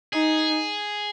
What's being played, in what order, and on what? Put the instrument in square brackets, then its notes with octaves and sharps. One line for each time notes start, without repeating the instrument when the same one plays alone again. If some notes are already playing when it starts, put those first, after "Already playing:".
[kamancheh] D#4 [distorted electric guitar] G#4